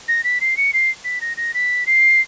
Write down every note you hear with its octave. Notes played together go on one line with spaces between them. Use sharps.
A#6
B6
C7
C#7
C7
B6
A#6
A#6
B6
C7